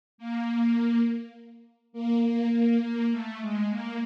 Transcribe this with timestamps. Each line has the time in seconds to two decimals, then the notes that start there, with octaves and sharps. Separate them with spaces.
0.18 A#3
1.93 A#3
2.22 A#3
2.52 A#3
2.82 A#3
3.11 A3
3.40 G#3
3.69 A#3